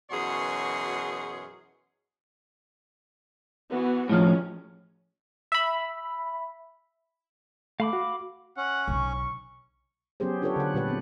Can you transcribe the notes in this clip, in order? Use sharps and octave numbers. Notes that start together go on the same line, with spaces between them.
F#2 B2 E3 G#4 C#5 C6
E3 B3 F#4
A2 F3 G#3 C#4
E5 B5
A3 F5 B5 D6
F#4
C#4 F#5
B1 D3 C#6
F#3 B3 C#4 G4 G#4 C5
D4 F4 G4 A4 B4 C#5
D3 F#5
A#2 G3 G4 B4 D5 F#5
B3 C4